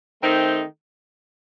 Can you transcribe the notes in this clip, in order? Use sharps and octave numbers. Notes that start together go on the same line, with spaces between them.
D#3 A3 C4 D#4